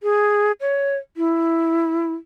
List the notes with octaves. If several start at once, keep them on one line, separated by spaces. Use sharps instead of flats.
G#4
C#5
E4